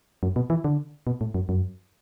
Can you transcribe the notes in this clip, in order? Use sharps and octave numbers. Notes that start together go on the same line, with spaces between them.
F#2
B2
E3
D3
B2
A2
F#2
F#2